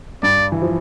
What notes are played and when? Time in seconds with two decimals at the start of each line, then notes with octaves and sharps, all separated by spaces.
0.23 G2 G3 D5
0.52 E3
0.62 F3